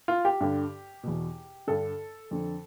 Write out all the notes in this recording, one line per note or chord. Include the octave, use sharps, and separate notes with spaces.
F4
G4
G2 D3
E2 B2
G2 D3 A4
F2 D3